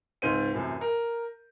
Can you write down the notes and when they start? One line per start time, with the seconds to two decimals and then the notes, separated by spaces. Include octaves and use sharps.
0.22 C#2 G#2 C4 G6 D#7
0.54 F#2 A2 C3 E3
0.81 A#4